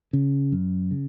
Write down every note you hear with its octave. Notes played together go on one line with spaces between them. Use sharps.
C#3
F#2
C#3